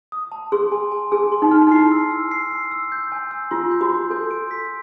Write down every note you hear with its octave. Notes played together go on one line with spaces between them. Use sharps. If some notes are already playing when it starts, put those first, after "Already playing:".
D#6
A5
G#4 C6
G#5
G#5
G#4 G#5
C6
D#4
F6
D#4
E4 C7
E6
E6
C7
E6
E6
G6
G#5
E6
F4 C6
G6
F#4
C6
A4 G6
D7
B6